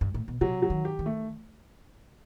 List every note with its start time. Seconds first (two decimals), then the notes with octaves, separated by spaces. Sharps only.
0.01 G2
0.14 A2
0.28 B2
0.41 C3 F#3
0.62 F#3
0.70 D#3
0.85 G4
0.99 D#3
1.06 A3